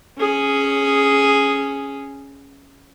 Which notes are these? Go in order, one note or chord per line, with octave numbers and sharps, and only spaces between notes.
C#4 G#4